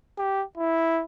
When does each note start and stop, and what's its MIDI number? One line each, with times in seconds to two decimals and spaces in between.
0.18 0.44 67
0.58 1.03 64